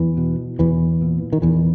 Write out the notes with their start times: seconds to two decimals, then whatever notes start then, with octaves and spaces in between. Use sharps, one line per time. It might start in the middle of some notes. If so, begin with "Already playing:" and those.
Already playing: E2 E3
0.17 B2
0.59 E2 E3
1.01 A#2
1.33 D#3
1.42 E2 E3